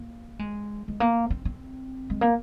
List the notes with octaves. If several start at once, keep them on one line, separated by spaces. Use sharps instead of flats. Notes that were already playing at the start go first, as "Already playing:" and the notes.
Already playing: A#3
G#3
G#3
A#3
C4
C4
G#3
A#3